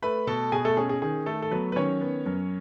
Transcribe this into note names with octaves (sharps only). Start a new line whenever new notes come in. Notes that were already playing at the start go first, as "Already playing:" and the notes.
A3 B4 B5
B2 A4 A5
B2 G#4 G#5
A3 A4
C#4 G#4
G#4
D#3 G#4
A3 A4
A4
F#3 B3 B4
B4
D#3 C#4 C#5
B3
F#2